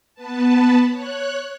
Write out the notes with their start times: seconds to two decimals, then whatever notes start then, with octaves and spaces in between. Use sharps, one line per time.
0.15 B3 B4 A5
0.89 C#5 F#6